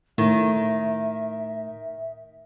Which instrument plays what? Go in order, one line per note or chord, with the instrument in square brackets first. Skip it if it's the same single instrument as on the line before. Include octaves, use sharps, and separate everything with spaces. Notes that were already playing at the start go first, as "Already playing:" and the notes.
[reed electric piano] A2 [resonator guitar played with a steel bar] D#3 [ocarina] E5